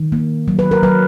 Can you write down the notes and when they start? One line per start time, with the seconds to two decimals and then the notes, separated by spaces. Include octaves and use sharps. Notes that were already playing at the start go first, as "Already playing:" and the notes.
Already playing: D#3
0.12 A#3
0.48 F#3
0.59 B4
0.71 A#4
0.83 F#3 B4